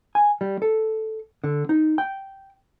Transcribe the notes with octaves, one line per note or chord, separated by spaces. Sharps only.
G#5
G3
A4
D3
D#4
G5